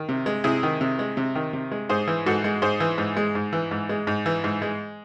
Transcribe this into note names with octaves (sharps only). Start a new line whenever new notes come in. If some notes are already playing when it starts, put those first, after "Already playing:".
Already playing: D#3
C3
G#3
C3 E4 G#4
D#3
C3
G#3
C3
D#3
C3
G#3
G#2 G#4 C5
E3
G#2 F#4 A4
G#3
G#2 G#4 C5
E3
G#2
G#3
G#2
E3
G#2
G#3
G#2
E3
G#2
G#3